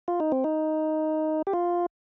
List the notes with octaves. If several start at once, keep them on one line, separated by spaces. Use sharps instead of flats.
F4
D#4
C4
D#4
G4
F4